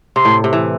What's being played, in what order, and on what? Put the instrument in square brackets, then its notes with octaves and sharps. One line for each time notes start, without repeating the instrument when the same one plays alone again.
[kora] C3 [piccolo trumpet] C6
[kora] A2
C3
E3